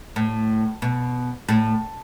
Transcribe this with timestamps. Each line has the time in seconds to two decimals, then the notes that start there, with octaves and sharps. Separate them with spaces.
0.16 A2
0.82 B2
1.49 A2